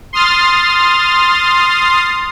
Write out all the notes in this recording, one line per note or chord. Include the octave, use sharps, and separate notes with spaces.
C6 D#6 F6 A6